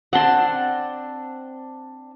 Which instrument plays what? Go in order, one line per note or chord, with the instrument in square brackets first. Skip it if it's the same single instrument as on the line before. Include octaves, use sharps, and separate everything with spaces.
[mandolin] C4 D4 A5 [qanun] F#5 C6